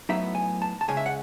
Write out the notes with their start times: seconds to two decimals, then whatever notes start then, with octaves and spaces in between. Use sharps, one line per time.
0.09 A2 F#3 B3 D#4 E5
0.35 G#5
0.62 A5
0.81 A5
0.88 C#2 C#3 G#3 C#4 G#5
0.97 E5
1.06 F#5